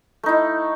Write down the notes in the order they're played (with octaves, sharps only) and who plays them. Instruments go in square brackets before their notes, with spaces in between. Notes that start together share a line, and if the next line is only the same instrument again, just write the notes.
[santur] A3
D#4
E4